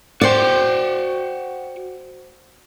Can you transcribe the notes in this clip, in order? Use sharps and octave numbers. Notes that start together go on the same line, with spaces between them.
F#4 C5 D5 G5